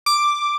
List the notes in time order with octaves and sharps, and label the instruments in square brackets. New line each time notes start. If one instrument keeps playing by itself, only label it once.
[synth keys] D6